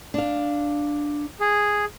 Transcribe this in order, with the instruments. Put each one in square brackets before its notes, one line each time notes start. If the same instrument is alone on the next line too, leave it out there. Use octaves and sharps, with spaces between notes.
[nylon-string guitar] D4 F5
[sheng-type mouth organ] G#4